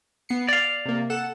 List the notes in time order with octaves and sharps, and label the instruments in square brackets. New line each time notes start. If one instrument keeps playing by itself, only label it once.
[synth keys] B3 C7 C#7
[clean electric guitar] D5 F5 [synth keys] D6
[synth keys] C3 A#3
A4 F#5 E7